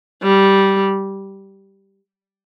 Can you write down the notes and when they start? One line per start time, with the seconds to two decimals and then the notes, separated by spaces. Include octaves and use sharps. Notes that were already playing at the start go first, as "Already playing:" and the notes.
0.23 G3